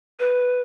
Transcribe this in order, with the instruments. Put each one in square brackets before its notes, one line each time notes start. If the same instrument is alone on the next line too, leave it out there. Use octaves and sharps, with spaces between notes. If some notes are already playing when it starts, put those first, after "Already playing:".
[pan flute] B4